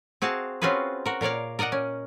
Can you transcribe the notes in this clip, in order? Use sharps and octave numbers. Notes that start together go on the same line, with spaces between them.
C4 F#4 G#4 F5 A5
C4 C#4 F4 F#4 G#4 B4
F#4 A#4
A#2 A#4 C#5 D5 F5
A#4 D5 D#5 F#5 A#5
C#4